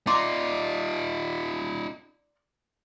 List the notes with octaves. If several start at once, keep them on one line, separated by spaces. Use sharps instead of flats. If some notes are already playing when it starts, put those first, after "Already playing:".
D#4 F4 D5 A#5 C6